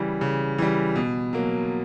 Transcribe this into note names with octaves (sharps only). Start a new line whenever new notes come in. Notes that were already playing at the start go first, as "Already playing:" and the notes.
Already playing: C#3 E3 G3
C#3
E3 G3
B2
F#3 A#3